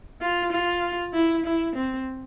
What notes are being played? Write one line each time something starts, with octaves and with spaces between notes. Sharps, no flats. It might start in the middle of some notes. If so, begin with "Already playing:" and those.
F4
F4
E4
E4
C4